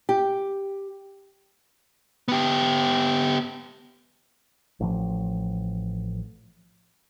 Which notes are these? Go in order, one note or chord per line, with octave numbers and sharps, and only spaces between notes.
G4
B3 G4
A1 F3